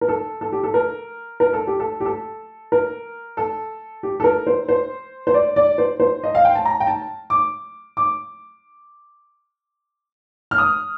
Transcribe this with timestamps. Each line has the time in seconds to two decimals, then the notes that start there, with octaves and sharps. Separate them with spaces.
0.01 A#4
0.09 A4
0.41 A4
0.52 G4
0.63 A4
0.74 A#4
1.40 A#4
1.53 A4
1.67 G4
1.80 A4
2.00 G4
2.05 A4
2.72 A#4
3.37 A4
4.03 G4
4.20 A4
4.24 A#4
4.47 C5
4.69 C5
5.27 C5
5.34 D5
5.56 D5
5.78 C5
6.00 C5
6.23 D#5
6.35 F5
6.45 G5
6.55 A5
6.65 A#5
6.80 G5
6.87 A5
7.30 D6
7.97 D6
10.51 F6
10.58 D#6